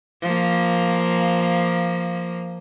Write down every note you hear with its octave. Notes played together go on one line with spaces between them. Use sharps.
F3 A#3